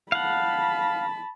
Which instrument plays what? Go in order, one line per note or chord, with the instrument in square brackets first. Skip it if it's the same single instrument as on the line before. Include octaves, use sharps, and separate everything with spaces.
[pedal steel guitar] F5 F#5 [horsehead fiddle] A5 B5